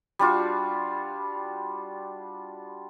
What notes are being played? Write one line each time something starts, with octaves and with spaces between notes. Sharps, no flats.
G3 D4 F4 F#4